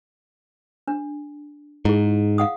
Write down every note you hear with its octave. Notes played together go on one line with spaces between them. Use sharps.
D4
G#2 E4 G#4
F5 F#5 D#6